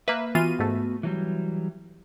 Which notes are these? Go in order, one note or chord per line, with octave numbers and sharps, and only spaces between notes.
A#3 B4 E5
E3 B3 F4 F#4 D#7
G#2 A3
E3 F#3 G3